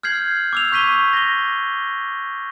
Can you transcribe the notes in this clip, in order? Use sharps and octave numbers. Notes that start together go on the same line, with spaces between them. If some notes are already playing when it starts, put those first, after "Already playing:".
F6 G6 G#6 C7 F#7
D6 E6 F7
C#6 G6 B6 D#7 G7
A#6 G7